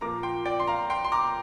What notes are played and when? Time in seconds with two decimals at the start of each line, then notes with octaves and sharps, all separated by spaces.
0.01 A#2 F3 A#3 A#5 D6
0.23 G5 C6
0.45 D5 G5
0.60 C6
0.67 F5 A#5
0.90 G5 C6
1.05 C6
1.12 A#5 D6